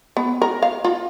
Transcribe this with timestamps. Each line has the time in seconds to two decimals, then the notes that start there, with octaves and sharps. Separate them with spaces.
0.17 B3
0.42 A#4
0.62 F5
0.85 F4